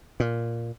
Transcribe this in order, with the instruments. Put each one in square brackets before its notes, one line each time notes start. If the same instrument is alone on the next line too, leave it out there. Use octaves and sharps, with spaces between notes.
[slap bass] A#2